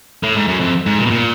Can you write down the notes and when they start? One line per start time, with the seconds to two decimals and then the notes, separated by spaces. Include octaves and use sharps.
0.23 A2
0.36 G#2
0.48 F#2
0.60 F2
0.86 G#2
0.99 A#2
1.06 B2
1.10 A#2